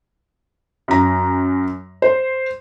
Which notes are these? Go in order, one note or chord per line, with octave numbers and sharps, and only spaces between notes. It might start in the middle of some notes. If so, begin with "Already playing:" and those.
F#2 A#5
C5